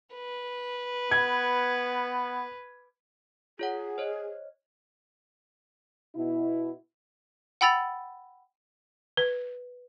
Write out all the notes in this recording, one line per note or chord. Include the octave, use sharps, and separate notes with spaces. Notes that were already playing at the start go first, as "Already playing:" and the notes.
B4
B3 G#6
F4 G#4 C#5 F#5
C5 C#5 D#5
B2 E4
F#5 G5 B5 E6 A6 F7
B4